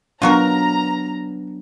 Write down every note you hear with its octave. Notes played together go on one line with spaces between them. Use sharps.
F#3 B3 D4 F4 F#4 A#4 A#5